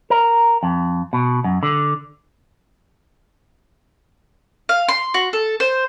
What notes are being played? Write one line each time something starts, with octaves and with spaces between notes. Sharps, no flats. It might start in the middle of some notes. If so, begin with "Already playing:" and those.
A#4
F2
B2
F#2
D3
F5
C6
F#4
A4
C5